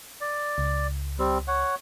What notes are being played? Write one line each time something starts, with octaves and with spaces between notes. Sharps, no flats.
D5
C#2
G3 C4
C#5 F#5